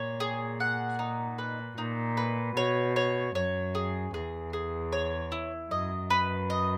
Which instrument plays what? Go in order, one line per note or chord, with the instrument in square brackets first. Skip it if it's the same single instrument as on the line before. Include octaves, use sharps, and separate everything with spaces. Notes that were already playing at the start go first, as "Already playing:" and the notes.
Already playing: [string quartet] A#2 [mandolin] C#5
[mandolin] G#4
F#5
D#4
B4
[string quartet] A#2 [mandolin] D#4
[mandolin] B4
[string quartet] B2 [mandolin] C#5
[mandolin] C#5
[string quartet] F#2 [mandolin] C#5
[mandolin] G#4
[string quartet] E2 [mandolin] G#4
[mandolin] G#4
C#5
E4
[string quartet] F#2 [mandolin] D#5
[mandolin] B4
D#5